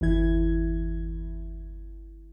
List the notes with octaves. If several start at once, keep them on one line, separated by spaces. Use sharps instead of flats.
G1 E2 E3 E4 G#6